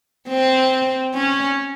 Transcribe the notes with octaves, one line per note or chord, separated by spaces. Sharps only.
C4
C#4